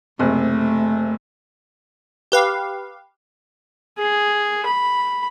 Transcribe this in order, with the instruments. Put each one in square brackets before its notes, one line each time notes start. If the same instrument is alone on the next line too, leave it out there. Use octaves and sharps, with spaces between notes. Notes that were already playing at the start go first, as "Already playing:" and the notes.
[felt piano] F#1 C3 [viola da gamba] A3
[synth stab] G4 B4 F5
[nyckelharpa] G#4
B5